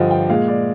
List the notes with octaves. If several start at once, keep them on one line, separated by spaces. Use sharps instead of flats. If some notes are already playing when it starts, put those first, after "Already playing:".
Already playing: G2 D3 F3 D#5 G5
G5
A#2 G#3 F5
D5